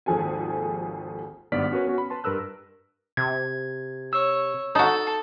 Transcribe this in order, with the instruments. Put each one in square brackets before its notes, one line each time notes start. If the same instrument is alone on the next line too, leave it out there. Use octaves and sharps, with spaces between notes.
[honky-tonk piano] G#1 D#2 F3 G#4 A4 G#5
[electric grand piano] G#1 G2 B3 D5 F6 B6
C#4 F#4 A#4 B4 C#5
B3 C#4 F#4
B5
B4 A5 C6
G2 A#4 B4 E6 F#6
[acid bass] C3 [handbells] G#6
[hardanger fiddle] C#5 [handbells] E6
[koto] D#4 F#4 [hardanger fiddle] A4